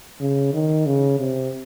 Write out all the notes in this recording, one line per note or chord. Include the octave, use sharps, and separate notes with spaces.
C#3
D#3
C#3
C3